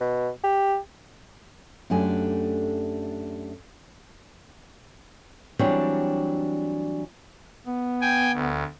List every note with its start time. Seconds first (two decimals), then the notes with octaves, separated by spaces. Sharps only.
0.01 B2
0.44 G4
1.90 F#2 A3 D4 G4 G#5
5.59 E3 F#3 G3 C4 D4 C#5
7.67 B3
8.01 G5 G#5
8.34 D2